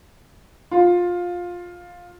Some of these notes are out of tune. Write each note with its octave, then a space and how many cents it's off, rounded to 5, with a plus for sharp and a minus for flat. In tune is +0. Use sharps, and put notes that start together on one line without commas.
F4 +15